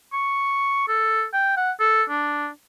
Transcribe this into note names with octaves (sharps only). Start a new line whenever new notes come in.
C#6
A4
G5
F#5
A4
D4